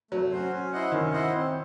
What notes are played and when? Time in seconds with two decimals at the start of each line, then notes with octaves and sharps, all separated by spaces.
0.11 F#3 A3
0.31 C#4 F#4 C5
0.52 C#4
0.72 E4 C5 D#5 F#5
0.92 D#3 C#4
1.12 E4 C5 D#5 F#5
1.33 C4